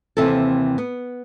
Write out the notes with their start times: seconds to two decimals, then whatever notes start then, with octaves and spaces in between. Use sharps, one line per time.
0.17 D#2 C3 E3 C4 A4
0.78 B3